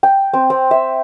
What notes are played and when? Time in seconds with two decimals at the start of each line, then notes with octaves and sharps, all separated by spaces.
0.03 G5
0.33 C4
0.50 C4
0.71 E5